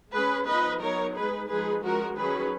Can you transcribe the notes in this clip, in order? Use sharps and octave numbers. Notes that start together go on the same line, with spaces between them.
G#3 C#4 G#4 B4
F3 B3 D#4 B4 D#5
F#3 B3 D#4 A#4 C#5
G#3 D#4 G#4 B4
F3 G#3 D#4 G#4 B4
F3 G#3 C#4 F#4 A#4
D#3 F#3 C#4 G#4 B4